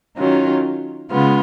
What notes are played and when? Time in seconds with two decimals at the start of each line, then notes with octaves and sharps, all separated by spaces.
0.17 D#3 F#3 C#4 F4
1.11 C#3 G#3 B3 F4